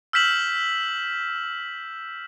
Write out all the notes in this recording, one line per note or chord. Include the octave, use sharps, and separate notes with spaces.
E6 F6 G6 B6 E7 F#7